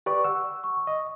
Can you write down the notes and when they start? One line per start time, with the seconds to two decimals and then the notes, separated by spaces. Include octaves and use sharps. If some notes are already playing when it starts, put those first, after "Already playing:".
0.06 G4 B4 D5 C#6
0.24 F#5 E6
0.64 C#6
0.87 D#5